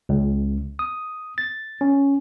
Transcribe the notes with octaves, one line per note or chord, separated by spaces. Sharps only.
C#2
D#6
A6
C#4